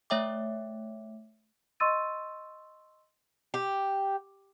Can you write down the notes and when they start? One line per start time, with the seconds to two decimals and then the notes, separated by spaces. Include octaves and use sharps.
0.10 A3 C#5 E5 G5 D6
1.80 D#5 C6 C#6 E6 A6 D#7
3.54 G4